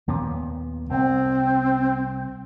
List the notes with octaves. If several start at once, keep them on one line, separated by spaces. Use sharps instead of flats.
D#2 A#2 B3
C2 C4